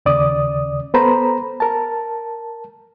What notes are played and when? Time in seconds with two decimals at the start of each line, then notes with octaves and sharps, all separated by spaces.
0.06 D#2 C#3 D5 D#6
0.94 B3 A4 B4 C5 A#5 B5
1.60 A#4 A5